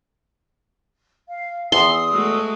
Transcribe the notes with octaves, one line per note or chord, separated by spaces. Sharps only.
F5
E2 C6 D#6 E6
G#3 A3 F#4